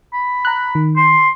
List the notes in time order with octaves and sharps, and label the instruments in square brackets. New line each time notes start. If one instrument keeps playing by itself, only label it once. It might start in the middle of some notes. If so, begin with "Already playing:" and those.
[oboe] B5
[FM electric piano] A#5 F#6
D#3
[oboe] C6